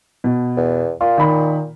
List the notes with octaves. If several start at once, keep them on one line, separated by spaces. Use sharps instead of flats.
B2
E2
A#2 F4
D#3 B5